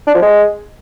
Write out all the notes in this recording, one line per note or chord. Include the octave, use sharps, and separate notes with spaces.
D4
F3
G#3